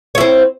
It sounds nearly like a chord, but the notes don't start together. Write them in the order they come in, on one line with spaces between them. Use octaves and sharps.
C#5 E4 C4